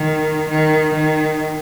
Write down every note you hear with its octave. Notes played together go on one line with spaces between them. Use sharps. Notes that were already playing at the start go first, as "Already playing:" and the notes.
Already playing: D#3
D#3
D#3